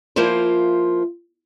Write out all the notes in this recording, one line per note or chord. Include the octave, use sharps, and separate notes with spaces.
F3 A#3 E4 F4 C5